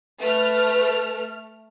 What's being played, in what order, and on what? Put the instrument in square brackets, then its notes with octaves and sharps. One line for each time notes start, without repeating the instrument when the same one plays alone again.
[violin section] A3 F6 [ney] B4